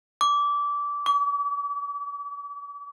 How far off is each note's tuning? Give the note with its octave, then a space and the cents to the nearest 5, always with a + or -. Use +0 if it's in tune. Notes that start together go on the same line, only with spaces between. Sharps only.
D6 -20
D6 -45